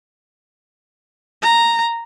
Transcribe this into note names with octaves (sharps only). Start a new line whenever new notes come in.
A#5